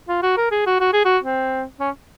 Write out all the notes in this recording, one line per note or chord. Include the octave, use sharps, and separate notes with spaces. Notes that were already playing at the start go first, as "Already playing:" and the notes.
F4
F#4
A#4
G#4
F#4
F#4
G#4
F#4
C4
C#4